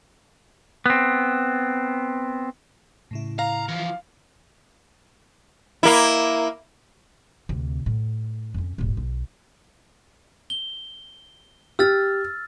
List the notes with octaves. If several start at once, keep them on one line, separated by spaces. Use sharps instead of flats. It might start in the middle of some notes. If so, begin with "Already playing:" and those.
B3 C4
A2 C#3 E4
F5 A#5
E3 F3
A#3 E4
D2 C3
A2
F2 C#4
D#1 G#1
B1
G7
G4 E6 F6 A6